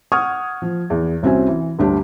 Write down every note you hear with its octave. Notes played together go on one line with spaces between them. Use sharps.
F#5 C#6 D#6 F6 G#6
F3
E2
C2 C4 C#4 F#4 E5 G#5
E3
G1 D2 D4 G4